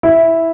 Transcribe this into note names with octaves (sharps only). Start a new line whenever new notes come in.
E4